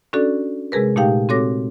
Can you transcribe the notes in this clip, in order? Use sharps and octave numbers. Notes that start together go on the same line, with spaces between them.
C#4 D4 F#4 A4 D5
C3 G#3 G#4 A#4 B4
A#2 A3 D#4 G4 F5 G5
C4 F#4 A4 C#5 D6 A#6